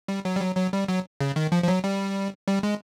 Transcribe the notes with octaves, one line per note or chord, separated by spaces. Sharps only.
G3
F#3
G3
F#3
F#3
G3
F#3
C#3
D#3
F3
F3
F#3
G3
G3
G#3